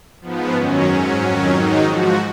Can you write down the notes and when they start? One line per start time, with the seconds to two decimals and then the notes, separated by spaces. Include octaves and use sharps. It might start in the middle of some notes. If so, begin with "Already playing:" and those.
0.21 G#2 F3 B3
0.53 F#2 D#3 F#3 C#4
0.87 G#2 F#3
1.18 F2 D#3 F#3
1.51 G#2 D#3 F#3 D#4
1.83 G#2 F3 F#4